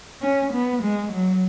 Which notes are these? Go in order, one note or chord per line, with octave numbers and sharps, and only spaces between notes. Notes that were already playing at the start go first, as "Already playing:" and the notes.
C#4
B3
G#3
F#3